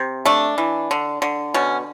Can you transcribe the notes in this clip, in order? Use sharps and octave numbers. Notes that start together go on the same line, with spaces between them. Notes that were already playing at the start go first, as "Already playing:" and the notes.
Already playing: C3
A3 D4
E3
D3
D3
B2 C#4